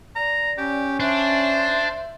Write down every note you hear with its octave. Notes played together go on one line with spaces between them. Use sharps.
D5 A#5
C#4 G4
D4 C5 E5